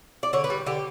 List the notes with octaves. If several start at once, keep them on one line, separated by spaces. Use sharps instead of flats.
D5
D3 C#5
B4
G3
D3 G4